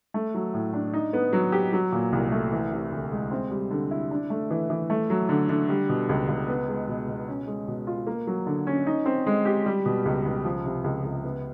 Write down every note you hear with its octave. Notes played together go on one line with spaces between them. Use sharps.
A3
F#3
A2
D4
D#4
B3
F#3
G4
F#3
A#2
C2
A3
E3
C3
D2
G#3
C4
G3
D3
E4
D4
A3
E3
E3
A3
F#3
D3
D3
G3
B2
C#2
C#2
B3
G#3
B2
B2
C#4
G#3
B2
F4
A#3
F#3
D3
C#4
D#4
C4
G#3
G4
G3
B2
C#2
C#2
F3
C3
C#2
C#2
B3